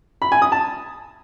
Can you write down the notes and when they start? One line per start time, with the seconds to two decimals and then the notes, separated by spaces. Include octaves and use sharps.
0.22 B5
0.32 G#5
0.42 D#6
0.52 A5